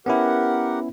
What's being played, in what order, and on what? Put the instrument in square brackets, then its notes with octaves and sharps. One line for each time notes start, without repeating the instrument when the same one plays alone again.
[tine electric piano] B3 C#4 E4 [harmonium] G4 A#4 F#5